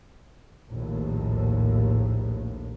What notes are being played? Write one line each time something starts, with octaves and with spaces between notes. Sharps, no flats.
A#1 D#2 A2